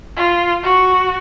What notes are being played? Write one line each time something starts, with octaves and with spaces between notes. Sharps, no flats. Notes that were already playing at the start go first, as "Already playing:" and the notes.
F4
F#4